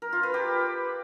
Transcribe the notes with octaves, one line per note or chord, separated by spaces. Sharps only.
A#4
F4
B4
G4